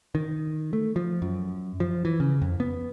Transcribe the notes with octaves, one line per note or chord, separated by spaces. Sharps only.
D#3
A3
F3
F#2
F3
E3
C#3
F2
B3